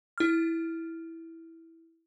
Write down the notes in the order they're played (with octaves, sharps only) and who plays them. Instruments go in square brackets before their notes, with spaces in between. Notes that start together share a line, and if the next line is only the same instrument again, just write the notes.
[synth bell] E4 F6